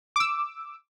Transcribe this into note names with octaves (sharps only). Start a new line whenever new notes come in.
D6 E6